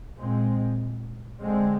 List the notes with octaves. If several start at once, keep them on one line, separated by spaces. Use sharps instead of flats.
A#2 G#3 C4
D3 G#3 C4